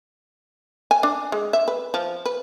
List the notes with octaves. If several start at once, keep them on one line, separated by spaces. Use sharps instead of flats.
G#5
D4
G#3
E5
B4
F3
B4